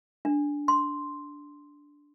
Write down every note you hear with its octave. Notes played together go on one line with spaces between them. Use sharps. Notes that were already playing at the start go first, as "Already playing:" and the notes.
D4
C6